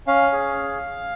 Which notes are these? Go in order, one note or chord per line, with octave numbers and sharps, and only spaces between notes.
C#4 F5
G#4